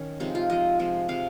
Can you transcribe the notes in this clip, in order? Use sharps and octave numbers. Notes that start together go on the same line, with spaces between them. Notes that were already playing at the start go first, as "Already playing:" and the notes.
Already playing: D#3 C#4
C3 F3 G#3 D#4
F4
C3 F3 G#3 D#5
C3 F3 G#3
C3 F3 G#3 F5